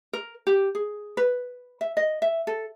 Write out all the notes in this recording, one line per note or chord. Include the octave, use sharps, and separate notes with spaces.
A#4
G4
G#4
B4
E5
D#5
E5
A4